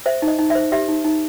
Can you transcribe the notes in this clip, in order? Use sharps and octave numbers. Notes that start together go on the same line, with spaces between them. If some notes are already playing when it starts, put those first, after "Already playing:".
C5 E5
D#4
D#5
D#4
C5 E5
G4 E5
D#4
D#4